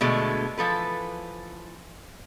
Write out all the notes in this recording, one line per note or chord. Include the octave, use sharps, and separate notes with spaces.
B2 D3 G#3 A3
E3 F3 A4 B4